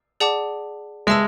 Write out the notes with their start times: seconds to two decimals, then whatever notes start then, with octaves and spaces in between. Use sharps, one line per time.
0.20 G#4 D5 F#5 A5 D6
1.07 G#3 E5 A5 E6